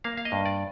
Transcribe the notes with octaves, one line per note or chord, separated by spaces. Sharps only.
A#3 F5
F5
D#5
G2
D5